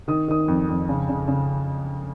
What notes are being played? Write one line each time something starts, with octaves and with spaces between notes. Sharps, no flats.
D#3 D#6
D#3 D#6
F2
F2
C#3
C#3
C#3